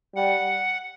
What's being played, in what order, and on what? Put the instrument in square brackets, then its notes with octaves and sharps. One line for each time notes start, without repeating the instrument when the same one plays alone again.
[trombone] G3 [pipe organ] F#5